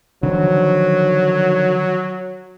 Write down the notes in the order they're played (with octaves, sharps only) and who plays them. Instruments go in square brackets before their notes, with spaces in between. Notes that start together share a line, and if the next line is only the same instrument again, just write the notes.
[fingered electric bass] D3 D#3 F3 [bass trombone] F#3